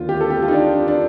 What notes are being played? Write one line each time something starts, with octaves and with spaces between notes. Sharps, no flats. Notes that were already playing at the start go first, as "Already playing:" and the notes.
Already playing: D#2 D3 F4
G4
A4
G4
F4
D#4
D4
D4